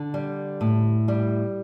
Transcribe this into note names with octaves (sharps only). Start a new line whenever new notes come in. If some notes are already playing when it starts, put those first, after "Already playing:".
Already playing: D3
G3
A2
G3